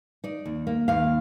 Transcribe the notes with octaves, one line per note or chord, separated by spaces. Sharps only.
D#4 D5
D#2
A#3
D#2 F5